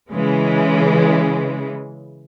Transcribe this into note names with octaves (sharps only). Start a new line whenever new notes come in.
C#3 E3 G#3